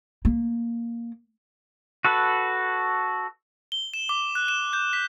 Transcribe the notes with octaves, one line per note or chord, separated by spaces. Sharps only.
A#3
F#4 A4 B4
G7
E7
D6
F#6
E7
G6
B6